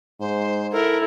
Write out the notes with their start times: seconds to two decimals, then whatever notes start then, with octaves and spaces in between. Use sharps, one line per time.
0.20 G#2 C5
0.72 E4 A4 A#4